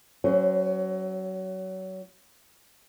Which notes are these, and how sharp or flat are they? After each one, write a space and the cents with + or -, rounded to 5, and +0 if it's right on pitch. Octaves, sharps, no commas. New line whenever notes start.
F#3 +25 C#4 +0 C5 +0